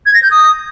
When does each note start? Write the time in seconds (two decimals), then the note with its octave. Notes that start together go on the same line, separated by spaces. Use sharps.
0.06 G#6
0.14 A#6
0.23 G6
0.31 D#6